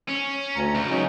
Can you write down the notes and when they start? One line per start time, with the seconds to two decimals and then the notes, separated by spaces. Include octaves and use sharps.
0.09 C#4
0.55 D2 A#5
0.75 C#2
0.90 F#3 C#4 D#4